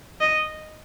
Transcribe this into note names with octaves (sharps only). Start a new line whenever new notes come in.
D#5